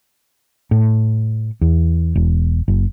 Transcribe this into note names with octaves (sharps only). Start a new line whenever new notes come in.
A2
E2
E1
F#1